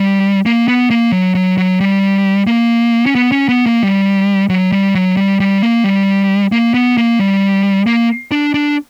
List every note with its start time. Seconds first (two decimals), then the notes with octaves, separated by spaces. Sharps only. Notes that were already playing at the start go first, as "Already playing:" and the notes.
Already playing: G3
0.46 A#3
0.68 B3
0.90 A#3
1.12 F#3
1.35 F#3
1.58 F#3
1.80 G3
2.47 A#3
3.06 C#4
3.15 B3
3.32 C#4
3.49 B3
3.66 A#3
3.83 G3
4.49 F#3
4.72 G3
4.95 F#3
5.17 G3
5.40 G3
5.63 A#3
5.84 G3
6.52 A#3
6.74 B3
6.97 A#3
7.19 G3
7.87 A#3
8.31 D4
8.54 D4